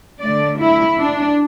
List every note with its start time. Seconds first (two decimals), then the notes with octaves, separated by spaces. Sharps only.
0.21 D3 A3 D4 D5
0.60 E4
0.99 D4